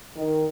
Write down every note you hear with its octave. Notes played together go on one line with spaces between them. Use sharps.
D#3